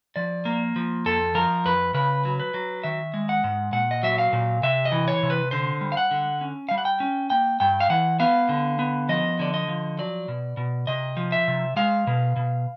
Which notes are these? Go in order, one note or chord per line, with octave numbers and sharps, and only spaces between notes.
F3 D5
A#3
F3
F2 A4
F3 A#4
F2 B4
C#3 B4
F#3
B4
F#3
D#3 E5
G#3
F#5
G#2
A#2 F#5
D#5
F#3 E5
F5
A#2
C3 E5
D#5
E3
C#5
C3
B4
D3 C5
G3
F5
F#5
D3
C#4
G3 F5
F#5
G5
C#4
A#3 G5
G2 G5
F5
E3 F#5
B3 F5
D3
B3
F3 D#5
D3 D5
D#5
F3
F#3 D5
B2
B2
C3 D#5
F3
E5
C3
G#3 F5
B2
B2